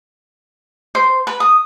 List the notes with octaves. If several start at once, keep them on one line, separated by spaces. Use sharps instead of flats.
C5
B4
D#6